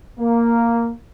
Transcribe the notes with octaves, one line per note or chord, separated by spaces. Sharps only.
A#3